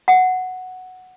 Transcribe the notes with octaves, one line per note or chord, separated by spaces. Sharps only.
F#5